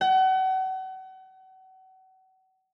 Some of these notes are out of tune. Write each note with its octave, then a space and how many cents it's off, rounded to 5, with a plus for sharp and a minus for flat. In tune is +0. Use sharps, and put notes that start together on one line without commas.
F#5 +35